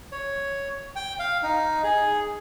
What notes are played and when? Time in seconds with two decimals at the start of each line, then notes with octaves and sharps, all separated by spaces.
0.12 C#5
0.96 G5
1.19 F5
1.43 D#4
1.84 G#4